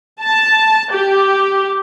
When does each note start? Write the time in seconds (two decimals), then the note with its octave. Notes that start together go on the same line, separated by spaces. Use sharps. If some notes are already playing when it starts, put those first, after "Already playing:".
0.20 A5
0.91 G4